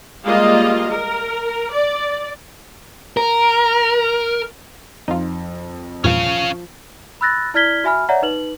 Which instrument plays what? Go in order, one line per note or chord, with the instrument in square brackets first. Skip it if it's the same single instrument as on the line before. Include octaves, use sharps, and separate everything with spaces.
[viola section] G3 G#3 A#3 F4 D#5 F5
A#4
D5
[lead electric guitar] A#4
[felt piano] F2 [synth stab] D#4 F4
[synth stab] E2 G2 A#2 [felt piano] F3 [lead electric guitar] C#4 F5
[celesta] B5 E6 F#6 A6 A#6
E4 D5 F6 G#6 B6 G7
F#4 E5 G#5 B5 F6
C#5 D5 E5 F#5 A#5
D#4 B4 F#7